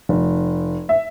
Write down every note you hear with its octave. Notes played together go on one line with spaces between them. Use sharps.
F1
E5